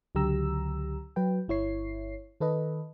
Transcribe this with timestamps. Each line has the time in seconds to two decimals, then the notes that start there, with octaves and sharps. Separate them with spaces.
0.15 C#2 D3 F#3 G4 A#5 E6
1.16 F#3 B4 G5
1.48 G1 E4 C#5 C7
2.40 D#3 A4 B4 D#5